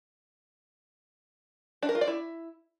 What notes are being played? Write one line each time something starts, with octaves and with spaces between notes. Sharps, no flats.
D4
A#4
F4
D5
E4